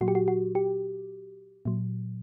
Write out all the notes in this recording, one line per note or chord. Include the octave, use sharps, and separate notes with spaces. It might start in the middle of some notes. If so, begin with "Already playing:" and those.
A#2 F#3 F#4
G4
F#4
F#4
G4
A#2 F#3